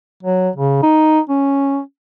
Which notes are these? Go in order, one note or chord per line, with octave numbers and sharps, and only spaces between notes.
F#3
C#3
D#4
C#4